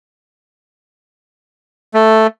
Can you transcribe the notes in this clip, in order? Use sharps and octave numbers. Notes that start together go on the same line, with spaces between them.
A3